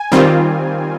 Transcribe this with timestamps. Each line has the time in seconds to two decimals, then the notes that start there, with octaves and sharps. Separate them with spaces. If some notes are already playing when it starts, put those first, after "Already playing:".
Already playing: G#5
0.12 D#3 G3 C4 F4